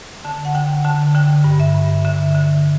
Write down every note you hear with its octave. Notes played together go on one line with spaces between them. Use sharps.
D3 A5
F#5
D3 G5
D3 A5
D3 G5
G2
E5
G2
D3 E5
D3